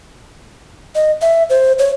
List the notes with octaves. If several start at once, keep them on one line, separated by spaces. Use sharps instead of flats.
D#5
E5
C5
C#5